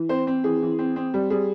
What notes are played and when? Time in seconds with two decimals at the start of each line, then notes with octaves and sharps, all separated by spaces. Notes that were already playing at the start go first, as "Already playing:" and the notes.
Already playing: E3
0.09 C4 C5
0.27 C4
0.44 E3 G#4
0.62 E3
0.79 C4
0.96 C4
1.14 G3
1.30 G3 G#4